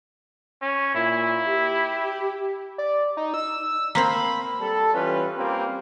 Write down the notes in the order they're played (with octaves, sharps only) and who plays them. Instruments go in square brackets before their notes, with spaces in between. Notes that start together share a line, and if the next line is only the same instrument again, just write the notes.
[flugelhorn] C#4
[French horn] A#2 [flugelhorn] E4
[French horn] G4
[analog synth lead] D5
D#4
E6
[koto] A#3 C4 C5 [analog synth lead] B5
[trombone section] G3 A4
E3 G3 C#4 F4 B4
G3 A#3 C4 C#4 F4 G4